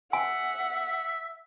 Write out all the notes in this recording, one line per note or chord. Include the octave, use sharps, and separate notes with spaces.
E5 F#5 G#5